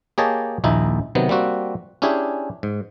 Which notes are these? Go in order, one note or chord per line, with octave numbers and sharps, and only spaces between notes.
A#3 G4 G#4 C#5 D#5 A5
A#1 D#2 D#4 E4
C3 D#3 F#3 B3
G3 A#3 C4 F#4
C#4 D4 E4 G4 G#4
G#2